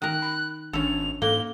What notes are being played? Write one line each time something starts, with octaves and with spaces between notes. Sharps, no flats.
D#3 A#4 F#6
B5
G#1 C#4 D4 A4 F7
G#2 A#3 A4 G7